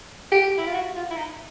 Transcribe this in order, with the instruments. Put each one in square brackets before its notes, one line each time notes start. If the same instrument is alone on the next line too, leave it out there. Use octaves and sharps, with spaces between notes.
[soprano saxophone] G4
E4
F4
F#4
F4
E4
D#4